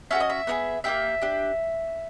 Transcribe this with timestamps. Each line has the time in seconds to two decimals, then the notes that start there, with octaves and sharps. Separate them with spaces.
0.11 C#4 F#4 A4 E5
0.20 D#5
0.30 E5
0.47 B3 D#4 G#4
0.84 A#3 D#4 G4 E5
1.22 D4 G4